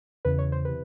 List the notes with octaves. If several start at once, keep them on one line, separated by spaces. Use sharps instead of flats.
E2 C#3 E3 B4
C#5
C5
C3 E3 B4